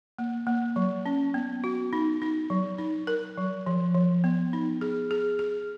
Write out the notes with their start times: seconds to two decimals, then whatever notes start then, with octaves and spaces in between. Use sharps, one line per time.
0.18 A#3
0.47 A#3
0.76 F#3
1.06 C#4
1.34 B3
1.64 F#4
1.93 D#4
2.22 D#4
2.50 F#3
2.78 D#4
3.07 A#4
3.38 F#3
3.66 F3
3.94 F3
4.24 B3
4.53 D#4
4.81 G#4
5.11 G#4
5.39 G#4